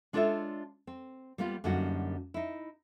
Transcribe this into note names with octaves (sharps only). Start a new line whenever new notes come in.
G#3 D4 F4 A4 C#5 E5
C4
G3 A#3 B3 F4
F#2 D3 G3 A#3 D#4 F#4
D#4 E4